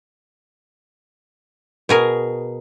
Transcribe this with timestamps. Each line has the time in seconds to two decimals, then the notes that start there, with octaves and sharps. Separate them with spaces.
1.89 B2 G#4 A#4